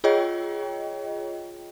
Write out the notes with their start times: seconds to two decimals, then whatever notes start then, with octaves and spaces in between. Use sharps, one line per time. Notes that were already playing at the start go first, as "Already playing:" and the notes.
0.04 F4 G#4 C#5 D#5 G5